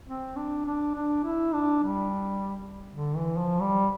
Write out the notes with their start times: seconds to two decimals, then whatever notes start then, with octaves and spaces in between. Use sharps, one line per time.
0.07 C4
0.36 D4
0.66 D4
0.95 D4
1.24 E4
1.54 D4
1.84 G3
2.94 D3
3.16 E3
3.38 F3
3.61 G3